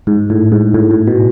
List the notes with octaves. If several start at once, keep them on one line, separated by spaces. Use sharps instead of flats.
G#2
A2
G#2
A2
A2
B2